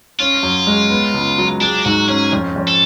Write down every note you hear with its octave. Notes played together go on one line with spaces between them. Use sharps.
C#4 F4
F#2
G#3
B3
C#2
F#3
D4 G#4
G#2 F#4
C#4 G#4
F2
F2
A4